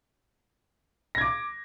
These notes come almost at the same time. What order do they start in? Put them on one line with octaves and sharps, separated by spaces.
A#6 G#6 D6